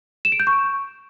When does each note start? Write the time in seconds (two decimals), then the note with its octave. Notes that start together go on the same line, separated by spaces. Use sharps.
0.25 E7
0.32 D7
0.40 G6
0.47 C#6